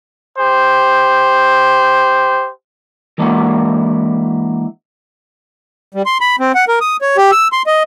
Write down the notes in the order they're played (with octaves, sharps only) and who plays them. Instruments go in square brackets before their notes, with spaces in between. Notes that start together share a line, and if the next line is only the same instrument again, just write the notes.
[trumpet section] G4 C5
[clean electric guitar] E3 G#3 A#3 D4 E4 F#4
[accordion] G3
C6
B5
C4
F#5
A#4
D#6
C#5
G4
E6
C6
D#5